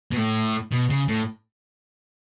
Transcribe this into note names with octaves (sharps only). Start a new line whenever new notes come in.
B2
A2
B2
C#3
A2